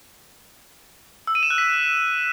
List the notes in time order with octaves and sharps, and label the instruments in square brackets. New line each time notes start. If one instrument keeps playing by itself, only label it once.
[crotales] E6
D#7
E7
F#6
B6